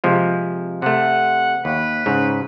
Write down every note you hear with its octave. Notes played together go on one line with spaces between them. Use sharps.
C3 F3 G#3
C3 A3 F#5
D#2 B4
G#2 C#3